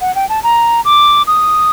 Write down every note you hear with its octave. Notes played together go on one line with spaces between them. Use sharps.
F#5
G5
A5
A#5
D6
D#6